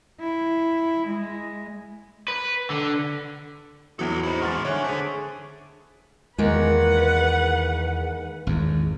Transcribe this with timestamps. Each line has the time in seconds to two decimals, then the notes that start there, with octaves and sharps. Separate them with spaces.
0.20 E4
1.06 G#3
2.28 B4
2.70 D3
3.99 E2 E3 F#3 A4 B4
4.23 D#4 E4 G#4 C5 D#5
4.42 A2 G#3 F#5 F6 A6
4.65 D3 C#5 E5 G#5 C#6 F#6
4.84 D4 G#4 A4 C5 C#6 B6
6.38 E2 D#3 G#3 A#3 B4 F#5
8.47 G#1 E2